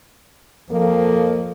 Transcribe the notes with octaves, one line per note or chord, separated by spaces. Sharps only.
F2 F3 A#3 A4